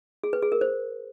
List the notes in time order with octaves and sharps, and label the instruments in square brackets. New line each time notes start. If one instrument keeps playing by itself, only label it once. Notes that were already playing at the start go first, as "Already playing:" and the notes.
[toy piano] G#4
B4
G#4
A#4
C5